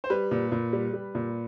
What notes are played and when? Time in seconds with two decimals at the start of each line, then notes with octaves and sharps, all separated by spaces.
0.04 C5
0.10 G3 B4
0.31 A#2
0.52 A#2
0.73 G3
0.94 G3
1.15 A#2